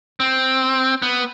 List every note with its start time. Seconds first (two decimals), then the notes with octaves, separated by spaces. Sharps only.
0.20 C4
1.02 B3